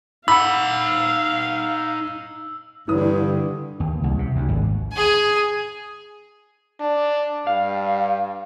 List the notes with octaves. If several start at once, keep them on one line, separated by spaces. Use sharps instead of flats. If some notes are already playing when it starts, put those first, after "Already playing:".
D#4 F5 F#5 B5 E6
G2 D3 E3 D#6
D#2
C2
C3
D2
G#1
G#4 G#5
D4
G2 F5